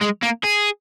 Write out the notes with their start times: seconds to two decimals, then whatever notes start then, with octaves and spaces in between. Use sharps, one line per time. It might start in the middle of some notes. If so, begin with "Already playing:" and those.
0.02 G#3
0.23 A#3
0.44 G#4